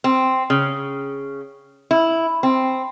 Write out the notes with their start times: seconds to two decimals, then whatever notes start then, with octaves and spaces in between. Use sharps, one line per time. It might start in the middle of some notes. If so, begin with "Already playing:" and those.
0.04 C4
0.50 C#3
1.91 E4
2.43 C4